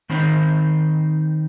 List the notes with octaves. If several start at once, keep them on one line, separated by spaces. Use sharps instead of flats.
D#3 C4 D#4 C5